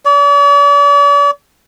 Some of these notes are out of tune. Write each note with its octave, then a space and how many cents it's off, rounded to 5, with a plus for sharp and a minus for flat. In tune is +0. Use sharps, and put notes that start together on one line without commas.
D5 -45